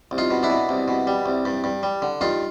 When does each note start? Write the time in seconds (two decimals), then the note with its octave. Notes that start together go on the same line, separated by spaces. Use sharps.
0.11 C2
0.18 D#4 F4
0.31 B2
0.43 D4 E4
0.50 B2
0.69 C2
0.88 B2
1.07 G3
1.26 C2
1.45 G2
1.64 G2
1.83 G3
2.02 D3
2.21 G2 D#4 F4